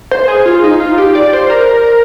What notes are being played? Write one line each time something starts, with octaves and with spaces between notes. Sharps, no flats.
C5
G#4
F4
D#4
F4
G4
D5
C5
A#4